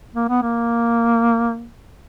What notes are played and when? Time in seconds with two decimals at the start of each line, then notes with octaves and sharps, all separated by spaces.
0.15 A#3
0.29 B3
0.42 A#3